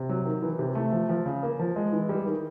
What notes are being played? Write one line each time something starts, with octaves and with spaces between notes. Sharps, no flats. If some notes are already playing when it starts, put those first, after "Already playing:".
Already playing: C3
F#3
D#3
E3
C3
A3
F3
F3
C#3
A#3
F3
G#3
E3
G3
D#3